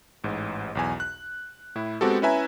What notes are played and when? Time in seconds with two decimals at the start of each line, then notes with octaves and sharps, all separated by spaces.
0.24 A1 G#2
0.75 B1 E2 G#5
1.00 F#6
1.75 A2 E4
2.01 G#3 B3 C4 F#4 G4 A4
2.22 C#4 E4 B4 E5 G#5 A#5